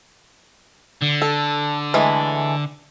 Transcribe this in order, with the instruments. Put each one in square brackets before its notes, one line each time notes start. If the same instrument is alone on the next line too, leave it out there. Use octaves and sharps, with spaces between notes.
[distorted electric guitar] D3
[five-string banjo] A4
E3 G#3 A3